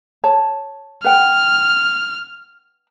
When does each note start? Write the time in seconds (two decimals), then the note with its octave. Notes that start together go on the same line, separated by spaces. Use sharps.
0.24 C#5 A5
1.04 B4 F#5 G5 F6